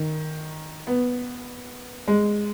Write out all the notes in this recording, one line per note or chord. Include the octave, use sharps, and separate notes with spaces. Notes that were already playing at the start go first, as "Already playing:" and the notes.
Already playing: D#3
B3
G#3